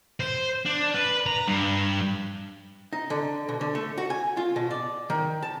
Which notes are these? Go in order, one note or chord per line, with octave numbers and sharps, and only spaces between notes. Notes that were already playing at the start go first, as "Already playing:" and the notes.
C5
D4
B4
A#5
G2
D#4
D3
B2
D3
A3
F#4
G#5
F4
B2
D5
D#3
A5